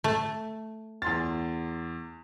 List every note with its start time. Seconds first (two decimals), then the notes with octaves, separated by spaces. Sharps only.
0.04 A3
1.02 E2 C6 A6